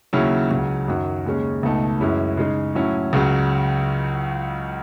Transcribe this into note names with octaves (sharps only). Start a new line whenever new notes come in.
D#2 C#3 F#3 C#4 E4
C#2 C#3 F#3
F#2 D#3 F#3
D#2 C#3 G#3 C#4
C#2 B2 A3 D#4
F#2 E3 G#3 C#4 E4
C#3 G#3 D#4
A2 F#3 C#4 E4
C#2 C#3 F#3